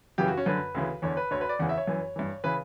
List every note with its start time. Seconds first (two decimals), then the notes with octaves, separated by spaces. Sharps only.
0.18 F#2 C#3 E3 G4
0.28 F#4
0.37 C#4
0.46 F#2 D3 B4
0.75 D2 C#3 E3
1.02 E2 D3 C#5
1.17 B4
1.31 D2 D3 C#5
1.41 B4
1.49 D5
1.59 E2 C#3 E3 F#5
1.69 E5
1.78 C#5
1.87 F#2 E3
2.16 G2 E3
2.44 C#3 E3 B4